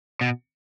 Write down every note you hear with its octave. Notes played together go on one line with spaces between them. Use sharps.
B2